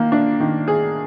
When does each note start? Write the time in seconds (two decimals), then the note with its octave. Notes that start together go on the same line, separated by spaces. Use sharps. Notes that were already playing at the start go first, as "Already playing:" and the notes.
Already playing: D#3 A#3
0.12 D4
0.40 D#3
0.68 G#4